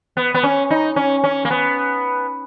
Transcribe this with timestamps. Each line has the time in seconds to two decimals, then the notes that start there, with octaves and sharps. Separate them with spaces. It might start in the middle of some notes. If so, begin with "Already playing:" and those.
0.17 B3
0.34 B3
0.43 C#4
0.70 D#4
0.96 C#4
1.24 C#4
1.45 A#3
1.51 B3